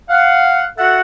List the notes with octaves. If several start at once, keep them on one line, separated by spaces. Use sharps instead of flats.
F5 F#5
F#4 A4 E5 F#5